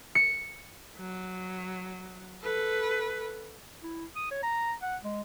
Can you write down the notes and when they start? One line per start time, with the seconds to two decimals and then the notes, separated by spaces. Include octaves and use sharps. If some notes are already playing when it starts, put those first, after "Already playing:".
0.15 C#7
0.97 F#3
2.42 A4 B4
3.83 E4
4.16 D#6
4.31 C#5
4.43 A#5
4.82 F#5
5.04 G#3